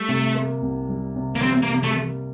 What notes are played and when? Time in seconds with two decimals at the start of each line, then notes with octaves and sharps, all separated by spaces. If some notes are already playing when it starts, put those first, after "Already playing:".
Already playing: G3 A3
0.08 C3
0.35 A#3
0.62 C2
0.89 G3
1.16 C3
1.35 A#3
1.42 G3 C4
1.62 A#3
1.69 C3
1.83 A3
1.96 A#3